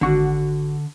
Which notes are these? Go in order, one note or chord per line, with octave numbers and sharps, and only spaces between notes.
G#1 D3 F#4